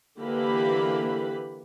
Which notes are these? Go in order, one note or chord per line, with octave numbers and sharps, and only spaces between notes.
D3 E3 A#3 G4 B4 B5